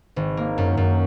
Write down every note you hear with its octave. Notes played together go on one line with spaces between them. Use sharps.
G#1
A#3
F#2
F#2